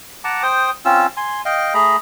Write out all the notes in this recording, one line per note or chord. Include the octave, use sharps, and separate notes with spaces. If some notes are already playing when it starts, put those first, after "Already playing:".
F#5 A5 A#5 D6
C5 G5 D#6
C4 C#4 F4 E6
G#5 C6
D#5 F5 G5
A3 G#4 A#5 B5